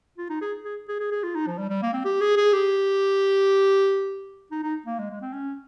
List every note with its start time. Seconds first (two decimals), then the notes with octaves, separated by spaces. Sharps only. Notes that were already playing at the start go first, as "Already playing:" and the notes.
0.18 F4
0.30 D#4
0.41 G#4
0.64 G#4
0.88 G#4
1.00 G#4
1.12 G#4
1.23 F4
1.35 D#4
1.47 F3
1.58 G3
1.70 G3
1.82 A#3
1.93 C4
2.05 G4
2.21 G#4
2.37 G#4
2.53 G4
4.52 D#4
4.64 D#4
4.86 A#3
4.99 G#3
5.10 G#3
5.21 C4
5.33 C#4